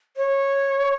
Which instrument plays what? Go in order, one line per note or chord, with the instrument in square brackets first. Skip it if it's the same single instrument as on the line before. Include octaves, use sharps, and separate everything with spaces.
[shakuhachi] C#5